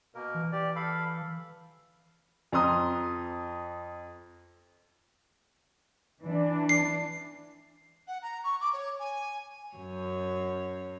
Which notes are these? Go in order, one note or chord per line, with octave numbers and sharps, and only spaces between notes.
B2 A#3 A#4
E3
G4 D5
A4 F5 B5
F2 A#5 C6 D#6
E3 D4
C7
F#5
A#5
C#6
D6
C#5
G#5
F#2 C#5